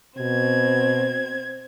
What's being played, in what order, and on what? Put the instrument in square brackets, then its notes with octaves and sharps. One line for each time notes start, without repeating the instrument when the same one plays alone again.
[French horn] B2 [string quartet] C4 G#6